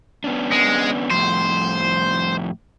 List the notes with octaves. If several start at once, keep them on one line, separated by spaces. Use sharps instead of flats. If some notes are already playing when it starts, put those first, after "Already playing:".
B3 C#4 D4
G#3
F2 A2 C5